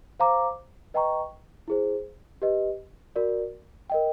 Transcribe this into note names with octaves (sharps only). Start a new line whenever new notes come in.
C5 F5 A#5 D6
B4 D#5 G5 A#5 C#6
E4 G#4 C5
G4 B4 D#5
F#4 A#4 D5
A#4 D#5 G5